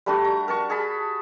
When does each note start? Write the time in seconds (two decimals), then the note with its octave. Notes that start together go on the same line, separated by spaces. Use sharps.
0.06 G3 A3 D4 F#4
0.24 A#5
0.48 A#4 A5 C#6
0.70 G#4 A5 B5